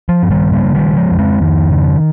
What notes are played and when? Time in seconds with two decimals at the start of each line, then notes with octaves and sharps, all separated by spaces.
0.09 F3
0.23 G2
0.30 D#3 G3
0.52 C#3 G3 A#3
0.75 D#3 G3
0.82 C#3
0.97 F3 G#3
1.11 F2
1.19 G#3 C4
1.41 F2 D#3
1.71 C#3